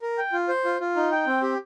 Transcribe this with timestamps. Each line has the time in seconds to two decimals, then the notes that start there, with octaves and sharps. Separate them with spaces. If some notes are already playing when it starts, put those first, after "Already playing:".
0.02 A#4
0.18 G5
0.32 F4
0.48 C5
0.65 F4
0.80 F4
0.96 D#4
1.12 G5
1.27 C4
1.43 G4